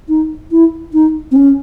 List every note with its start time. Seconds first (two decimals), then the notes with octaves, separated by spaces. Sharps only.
0.09 D#4
0.51 E4
0.93 D#4
1.31 C4
1.36 C#4